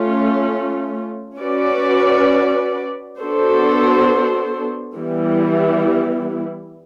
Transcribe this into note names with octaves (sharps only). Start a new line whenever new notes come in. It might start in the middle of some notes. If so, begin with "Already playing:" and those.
Already playing: A3 C#4 F4
C#4 F#4 B4 D5
B3 D4 F#4 A4 C5
E3 G3 B3 E4